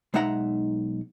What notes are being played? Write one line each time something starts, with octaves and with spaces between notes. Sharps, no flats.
B1 G#3 D#4 E5 F#5 A#5